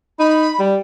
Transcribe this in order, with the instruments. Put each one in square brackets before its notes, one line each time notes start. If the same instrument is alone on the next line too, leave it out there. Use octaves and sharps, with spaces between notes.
[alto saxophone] D#4 [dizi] B5
[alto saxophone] G3